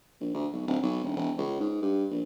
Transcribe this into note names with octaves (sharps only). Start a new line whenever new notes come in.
A#1
D2
B1
D1
B1
E1
E1
C#2
G#2
G2
A#1